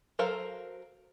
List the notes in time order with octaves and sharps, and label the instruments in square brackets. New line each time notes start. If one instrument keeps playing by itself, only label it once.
[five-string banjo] F#3 A4 A#4 C5 F5